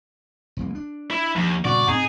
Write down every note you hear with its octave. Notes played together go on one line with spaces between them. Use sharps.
F1 C2 A#3
D4
E4
D#2 F3
G2 A#2 C#3 B3 F#4 D5
A2 C4 D#4 G#4